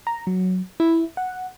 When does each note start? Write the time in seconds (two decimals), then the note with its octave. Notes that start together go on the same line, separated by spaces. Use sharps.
0.07 A#5
0.27 F#3
0.80 E4
1.17 F#5